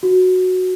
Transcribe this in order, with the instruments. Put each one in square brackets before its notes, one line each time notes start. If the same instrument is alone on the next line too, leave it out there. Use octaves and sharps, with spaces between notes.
[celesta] F#4